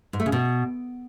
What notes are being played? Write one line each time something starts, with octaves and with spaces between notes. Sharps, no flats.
G#2
A3
C#3
B2